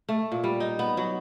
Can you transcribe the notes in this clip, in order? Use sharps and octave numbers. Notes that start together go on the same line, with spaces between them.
A3
A#2
G3
D#4
B3
F#3